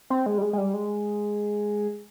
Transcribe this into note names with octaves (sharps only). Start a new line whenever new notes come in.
C4
G#3
G3
G#3
G#3
G3
G#3